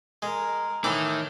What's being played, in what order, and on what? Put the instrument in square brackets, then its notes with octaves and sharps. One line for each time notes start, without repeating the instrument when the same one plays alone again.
[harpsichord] G#3 [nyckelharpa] A#4
[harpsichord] A2 E3 D6 [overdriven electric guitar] D#3 [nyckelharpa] D#5